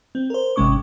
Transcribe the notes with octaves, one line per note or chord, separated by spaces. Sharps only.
C4
A#4 C5
G#1 C3 G#3 C#4 C#6 D6